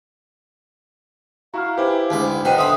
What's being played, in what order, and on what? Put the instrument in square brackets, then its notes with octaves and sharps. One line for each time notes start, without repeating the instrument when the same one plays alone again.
[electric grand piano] E4 F#4 [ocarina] F5 [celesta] A#5 C#6 F6
[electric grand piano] E4 G4 [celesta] B4 C5 G#5
[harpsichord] D2 G#2 D6
[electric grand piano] B1 B4 D#7 [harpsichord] F#4 [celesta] C5 D#5 [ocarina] G5
[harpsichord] D3 B5 [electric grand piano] E5 C6 [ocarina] D#6